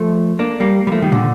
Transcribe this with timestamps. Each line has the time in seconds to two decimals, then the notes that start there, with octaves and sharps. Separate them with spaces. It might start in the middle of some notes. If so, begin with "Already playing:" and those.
Already playing: F3 A3
0.39 A#3 D4
0.60 G3 A#3
0.87 G3
0.92 F3 A3
1.02 D#3 G3
1.12 A#2 D3